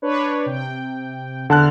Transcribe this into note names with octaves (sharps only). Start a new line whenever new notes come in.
D4 B4 C#5
C3 G5
E2 D3 A5 F6 F#6